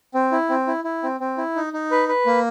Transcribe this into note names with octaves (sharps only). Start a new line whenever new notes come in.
C4
E4
C4
E4
E4
C4
C4
E4
D#4
D#4
B4
B4
A#3